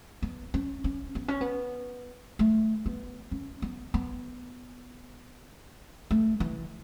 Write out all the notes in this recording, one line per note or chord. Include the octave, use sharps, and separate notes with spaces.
B3
C#4
C#4
B3
C#4
B3
A3
B3
C#4
B3
B3
A3
E3